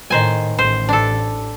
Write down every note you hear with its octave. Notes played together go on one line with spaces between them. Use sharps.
A2 D#3 C5 G#5
A1 C5
D4 A4